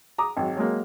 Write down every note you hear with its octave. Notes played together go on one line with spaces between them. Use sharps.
A#5 D6 D#6
G#1 F#3
F#3 G#3 A#3